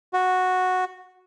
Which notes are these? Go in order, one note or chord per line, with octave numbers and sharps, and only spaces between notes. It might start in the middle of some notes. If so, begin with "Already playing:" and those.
F#4